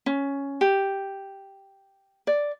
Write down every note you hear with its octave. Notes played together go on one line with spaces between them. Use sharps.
C#4
G4
D5